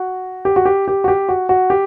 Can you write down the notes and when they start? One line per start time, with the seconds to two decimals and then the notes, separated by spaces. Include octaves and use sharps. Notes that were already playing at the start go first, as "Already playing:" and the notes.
Already playing: F#4
0.45 G4
0.56 F#4
0.65 G4
0.88 G4
1.04 F#4
1.08 G4
1.29 F#4
1.49 F#4
1.70 G4